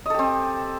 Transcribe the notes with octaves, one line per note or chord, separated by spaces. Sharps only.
C4 G4 A4 D#5